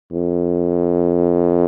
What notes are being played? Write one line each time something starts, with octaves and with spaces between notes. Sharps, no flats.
F2